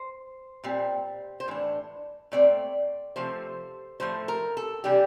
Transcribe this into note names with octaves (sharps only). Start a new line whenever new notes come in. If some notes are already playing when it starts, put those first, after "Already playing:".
Already playing: C5
A#2 G3 C4
C5
A2 E3 D4
A#2 A3 C4 D5
C3 F3 A3 C5
A2 F3 A3 C5
A#4
A4
C3 E3 G3 D4 G4